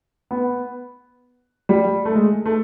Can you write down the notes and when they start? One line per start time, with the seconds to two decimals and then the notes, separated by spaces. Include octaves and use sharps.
0.31 B3
1.69 G3
2.05 A3
2.15 G#3
2.46 A3